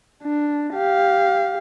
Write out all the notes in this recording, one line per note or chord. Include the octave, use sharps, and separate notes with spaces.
D4
G4 F5